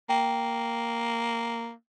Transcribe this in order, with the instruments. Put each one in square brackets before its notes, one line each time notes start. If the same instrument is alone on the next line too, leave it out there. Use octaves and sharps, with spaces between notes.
[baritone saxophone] A#3 [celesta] G5